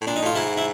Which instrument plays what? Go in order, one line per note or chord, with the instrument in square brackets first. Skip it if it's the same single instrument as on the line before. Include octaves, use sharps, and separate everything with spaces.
[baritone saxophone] A2
[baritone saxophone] A#2 [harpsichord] D4
[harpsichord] D#4
[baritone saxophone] A2 [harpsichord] F4
[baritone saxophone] G#2 [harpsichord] E4
[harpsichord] E4